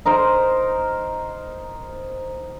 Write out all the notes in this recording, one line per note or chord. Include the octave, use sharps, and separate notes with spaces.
D#4 A#4 C5